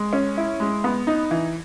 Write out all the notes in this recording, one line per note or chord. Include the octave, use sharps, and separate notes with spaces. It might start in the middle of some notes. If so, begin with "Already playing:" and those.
Already playing: G#3
C#4
E4
G#3
B3
D#4
E3